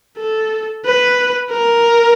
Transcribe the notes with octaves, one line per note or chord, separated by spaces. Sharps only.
A4
B4
A#4